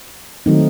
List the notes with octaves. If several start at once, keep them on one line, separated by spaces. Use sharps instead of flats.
D#3 F#3 A3 C4 D#4